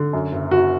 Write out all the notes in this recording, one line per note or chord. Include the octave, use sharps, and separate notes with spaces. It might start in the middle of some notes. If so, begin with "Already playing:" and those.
Already playing: D3
F#2
F#1
F#1 F#4